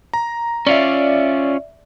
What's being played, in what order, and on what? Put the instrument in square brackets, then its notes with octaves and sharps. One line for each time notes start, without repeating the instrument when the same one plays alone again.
[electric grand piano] A#5
[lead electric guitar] C#4 F4 [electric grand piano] D5 E5